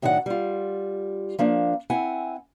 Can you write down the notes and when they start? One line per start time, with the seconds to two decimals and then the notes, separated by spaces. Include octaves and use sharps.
0.02 A2 D#3 F#3 D4 F#5
0.26 G3 F4
1.39 F3 A#3 D4
1.90 C4 E4 F#5 G#5